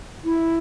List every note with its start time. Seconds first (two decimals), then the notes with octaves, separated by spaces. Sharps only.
0.25 E4